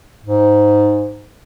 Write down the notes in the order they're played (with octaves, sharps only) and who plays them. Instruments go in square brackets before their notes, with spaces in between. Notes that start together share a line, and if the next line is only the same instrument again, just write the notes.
[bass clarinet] G#2